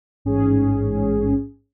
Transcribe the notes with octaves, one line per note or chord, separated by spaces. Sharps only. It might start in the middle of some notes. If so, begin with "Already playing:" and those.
A1 G#2 C#4 G#4